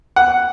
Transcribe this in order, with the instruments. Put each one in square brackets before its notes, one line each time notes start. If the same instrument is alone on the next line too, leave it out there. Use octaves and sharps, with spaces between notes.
[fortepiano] F#5